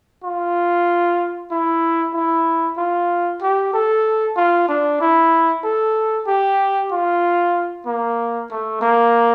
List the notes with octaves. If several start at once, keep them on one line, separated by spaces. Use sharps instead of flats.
F4
E4
E4
F4
G4
A4
F4
D4
E4
A4
G4
F4
A#3
A3
A#3